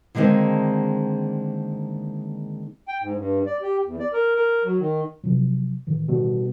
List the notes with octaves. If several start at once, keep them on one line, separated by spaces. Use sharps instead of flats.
D3 D#3 G#3 A#3 C4 D4
G5
G#2
G2
D5
G4
E2
D5
A#4
A#4
F#3
D#3
C3 F3 F#3
A2 D#3 E3
B2 G3